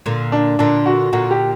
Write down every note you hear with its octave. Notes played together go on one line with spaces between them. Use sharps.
A#2 D3
D4
A#2 D3 D4
F#4
A#2 D3 F#4
G4